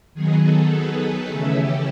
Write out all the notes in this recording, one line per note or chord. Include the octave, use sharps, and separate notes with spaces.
D#3 F#3 B3 D#4 G#4
A4
B4
C#3 E3 A3 C#4 E4 A4
G4